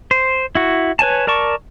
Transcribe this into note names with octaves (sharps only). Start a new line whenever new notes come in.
C5
E4 F#4
B4 C#5 G#5 A5
A#4 D5 A5 C#6